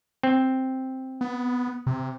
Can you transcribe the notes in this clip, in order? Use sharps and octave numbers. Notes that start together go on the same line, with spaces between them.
C4
B3
C3